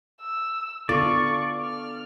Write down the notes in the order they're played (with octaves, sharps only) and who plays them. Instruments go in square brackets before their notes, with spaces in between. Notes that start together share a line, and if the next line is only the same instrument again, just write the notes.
[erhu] E6
[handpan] D3 B3 A4 [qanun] F4 [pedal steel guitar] D5 [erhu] C#6
[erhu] F6